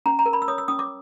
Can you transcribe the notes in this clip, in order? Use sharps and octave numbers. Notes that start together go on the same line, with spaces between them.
C#4 A#5
A#5
A#4
B5
E6
C#5 D#6
E6
C#4 D#6
D6